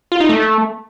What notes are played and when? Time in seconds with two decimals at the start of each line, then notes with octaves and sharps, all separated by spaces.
0.12 F4
0.20 D#4
0.29 A3